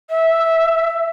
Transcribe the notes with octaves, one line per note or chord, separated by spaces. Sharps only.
E5